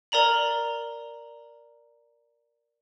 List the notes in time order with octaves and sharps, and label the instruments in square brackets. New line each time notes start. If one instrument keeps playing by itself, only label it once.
[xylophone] A#4 D5 A#5 F#7